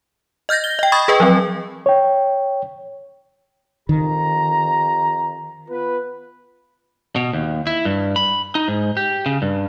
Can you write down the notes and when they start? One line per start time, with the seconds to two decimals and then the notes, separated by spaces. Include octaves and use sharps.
0.49 D#5 F6 G6 A6 A#6
0.64 G7
0.79 D#5 G5
0.92 B5 C#6 D#6 G#6 A6
1.08 G#4 B4 D#5 G5
1.20 F3 F#3 C4
1.86 C#5 G5
3.89 F2 D#3 G4 A#5
5.69 B3 F4 B4
7.16 B2
7.33 D#2
7.67 E4
7.85 G2
8.16 B5
8.55 D#4
8.68 G#2
8.97 G4
9.26 C#3
9.42 G2